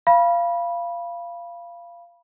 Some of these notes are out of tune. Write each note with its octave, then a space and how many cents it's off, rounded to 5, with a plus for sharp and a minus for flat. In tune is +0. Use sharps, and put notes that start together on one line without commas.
F5 -20 B5 -20